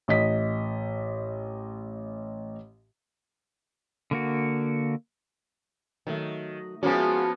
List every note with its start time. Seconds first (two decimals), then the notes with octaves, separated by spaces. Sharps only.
0.08 A1 D#5 B6
4.11 D3 A#3 F#4
6.07 D#3 F#3 A3
6.83 F3 G#3 A#3 B3 C#4 E4 F#4 G#4